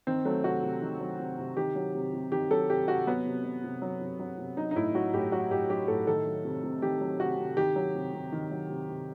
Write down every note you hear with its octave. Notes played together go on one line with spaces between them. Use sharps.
D#3 C4
F#3 A3
C3 F#4
C3
D#3
F#3
C3
C3
D#3 G4
F#3
C3
C3
D#3 G4
F#3 A4
C3 G4
C3 F#4
F#3 B3
C3
F#3
C3
F#3
C3
F#3
C3
F#3 D#4
D#4
A2 E4
F#3 F#4
A2 G4
F#3 F#4
A2 G4
F#3 G4
A2 A4
D#3 A4
F#3
C3
C3
D#3 G4
F#3
C3 F#4
C3
D#3 G4
F#3
C3
C3
D#3
F#3
C3
C3